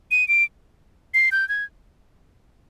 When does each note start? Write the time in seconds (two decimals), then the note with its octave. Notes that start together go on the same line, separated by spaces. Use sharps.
0.11 D#7
0.28 D7
1.14 C7
1.32 G6
1.49 G#6